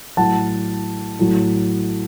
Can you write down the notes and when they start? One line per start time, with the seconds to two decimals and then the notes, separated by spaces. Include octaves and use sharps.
0.17 A2 F#3 F#5 A5
1.19 A2 F#3